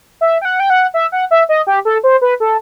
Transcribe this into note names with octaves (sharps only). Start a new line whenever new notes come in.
E5
G5
F#5
G5
F#5
E5
F#5
E5
D#5
G4
A4
C5
B4
A4